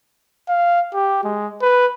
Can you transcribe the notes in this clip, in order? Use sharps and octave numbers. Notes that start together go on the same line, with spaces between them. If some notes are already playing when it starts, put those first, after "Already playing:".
F5
G4
G#3
B4